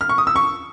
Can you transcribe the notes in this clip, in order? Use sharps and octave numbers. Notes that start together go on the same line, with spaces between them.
F6
C#6
D#6
E6
C#6